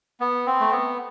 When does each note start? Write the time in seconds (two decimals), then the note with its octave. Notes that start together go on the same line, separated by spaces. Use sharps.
0.20 B3
0.46 C4
0.60 A3
0.71 B3